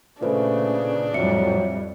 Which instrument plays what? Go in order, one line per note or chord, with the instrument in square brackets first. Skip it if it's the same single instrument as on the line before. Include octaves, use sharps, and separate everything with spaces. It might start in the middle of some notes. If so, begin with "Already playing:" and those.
[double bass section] A#2 C#3 [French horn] A3 [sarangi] D4 [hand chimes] F4 B4 C5
[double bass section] F2 A2 G3 [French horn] F#3 [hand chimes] C4 E5 C#7